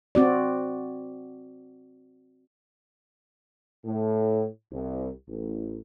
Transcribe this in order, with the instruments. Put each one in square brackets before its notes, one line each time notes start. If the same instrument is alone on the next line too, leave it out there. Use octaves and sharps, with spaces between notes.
[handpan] C4 F#4 D5
[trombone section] A2
C2
A1